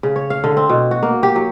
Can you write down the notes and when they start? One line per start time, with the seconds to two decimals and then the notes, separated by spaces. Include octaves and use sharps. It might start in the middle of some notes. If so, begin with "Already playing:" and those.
0.03 C#3
0.16 C#5
0.30 F5
0.44 D3
0.57 C4
0.69 B2
0.91 F#4
1.03 A#3
1.23 G4
1.36 F#3